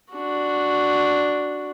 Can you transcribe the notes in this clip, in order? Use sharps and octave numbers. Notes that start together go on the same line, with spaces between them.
D4 F#4